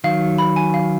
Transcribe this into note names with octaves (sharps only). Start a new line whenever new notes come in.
D#3 F#3 F5
F5
B5
G#5
F5